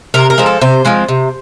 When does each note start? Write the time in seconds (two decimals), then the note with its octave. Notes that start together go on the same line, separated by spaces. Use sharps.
0.14 C3 A#4
0.30 A#4
0.38 F3 G#3 C4
0.46 A4
0.61 C3 C5
0.85 F3 G#3 C4
1.08 C3